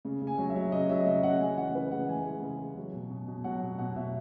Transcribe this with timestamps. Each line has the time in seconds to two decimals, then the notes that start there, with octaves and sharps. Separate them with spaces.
0.05 C#3
0.22 C#3
0.27 G#5
0.38 F#3
0.50 E5
0.56 F#3
0.72 C#3 D#5
0.89 F#3 E5
1.00 D#5
1.06 C#3 E5
1.23 C#3 F#5
1.40 C#3 G#5
1.58 E3 F#5
1.74 C#3 B4
1.91 C#3 F#5
2.08 E3 G#5
2.25 G#3
2.42 C#3
2.59 C#3
2.76 F#3
2.93 B2
3.11 B2
3.28 B2
3.44 F#3 F#5
3.62 B2
3.79 B2 F#5
3.96 B2 E5